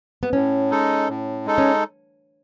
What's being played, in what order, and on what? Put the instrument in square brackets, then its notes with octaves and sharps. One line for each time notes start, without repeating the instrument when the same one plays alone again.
[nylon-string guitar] B3
[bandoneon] A2 [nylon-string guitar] C#4
[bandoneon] G#3 D#4 A4
A2
G#3 D#4 A4
[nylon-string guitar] C#4